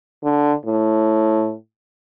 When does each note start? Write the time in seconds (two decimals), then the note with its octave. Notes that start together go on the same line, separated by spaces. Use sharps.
0.24 D3
0.65 A2